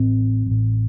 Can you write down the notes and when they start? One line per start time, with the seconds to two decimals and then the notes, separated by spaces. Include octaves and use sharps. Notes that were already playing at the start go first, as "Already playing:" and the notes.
Already playing: A1 A2 C4
0.46 A1 A2